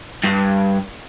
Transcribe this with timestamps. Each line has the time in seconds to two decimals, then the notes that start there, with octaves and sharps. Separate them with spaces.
0.24 G2